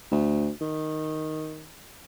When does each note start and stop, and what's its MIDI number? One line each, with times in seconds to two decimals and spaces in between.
0.11 0.49 38
0.61 1.70 51